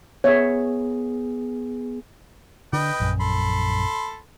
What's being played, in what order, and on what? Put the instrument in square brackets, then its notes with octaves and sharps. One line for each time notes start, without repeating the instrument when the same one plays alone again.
[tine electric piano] B3 G#4 [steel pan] C#5 E5
[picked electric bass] D3 [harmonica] B4 D#5 G5
[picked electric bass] A#1 F#2
[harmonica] A4 B5 C6